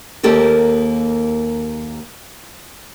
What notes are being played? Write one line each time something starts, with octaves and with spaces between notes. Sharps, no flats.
D#2 A#3 G4 A4 A#4